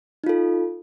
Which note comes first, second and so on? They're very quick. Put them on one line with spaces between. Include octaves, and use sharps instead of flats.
D#4 F4 A4